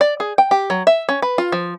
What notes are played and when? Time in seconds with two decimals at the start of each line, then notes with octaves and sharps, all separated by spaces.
0.01 D5
0.20 G#4
0.38 G5
0.51 G4
0.70 F#3
0.87 E5
1.09 C#4
1.22 B4
1.38 F4
1.52 F3